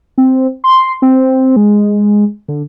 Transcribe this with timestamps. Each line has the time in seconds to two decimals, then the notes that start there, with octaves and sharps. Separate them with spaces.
0.18 C4
0.64 C6
1.02 C4
1.56 G#3
2.48 D3